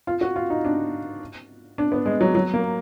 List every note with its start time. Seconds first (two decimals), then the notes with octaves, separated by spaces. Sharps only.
0.07 F4
0.21 F#4
0.36 F4
0.50 D#4
0.65 D4
1.78 D4
1.92 B3
2.06 G#3
2.21 F#3
2.35 F#3
2.54 A#3